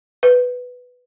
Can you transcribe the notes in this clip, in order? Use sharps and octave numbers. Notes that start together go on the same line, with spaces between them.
B4